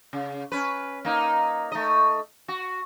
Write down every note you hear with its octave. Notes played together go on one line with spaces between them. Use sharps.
C#3
C#4 B4
A#3 D#4
A3 D#5
F#4